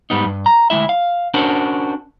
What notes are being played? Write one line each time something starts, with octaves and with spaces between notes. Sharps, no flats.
G#2 G3 B3 D#4
G2
A#5
D2 F3 G#3 E4 E5
F5
C#4 D4 F#4 A#4 C5